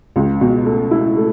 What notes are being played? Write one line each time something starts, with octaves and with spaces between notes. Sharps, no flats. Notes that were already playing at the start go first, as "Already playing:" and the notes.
C#2
B2
A3
E4
A3